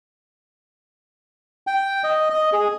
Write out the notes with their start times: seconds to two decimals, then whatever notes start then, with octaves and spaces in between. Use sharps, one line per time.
1.67 G5
2.04 D#5
2.30 D#5
2.53 G#4